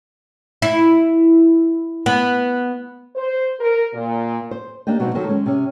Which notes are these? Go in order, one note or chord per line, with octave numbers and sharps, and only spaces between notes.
E4
B3
C5
A#4
A#2
C5
A#3 D4 G4 D#5 G5
B2 F#3 G#3 B3 C4 D#4
D#3 F#3 A4 C5
G#3 C#4
C3 C#4